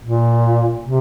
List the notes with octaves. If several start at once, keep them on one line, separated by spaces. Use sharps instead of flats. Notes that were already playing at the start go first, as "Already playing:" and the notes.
A#2
C3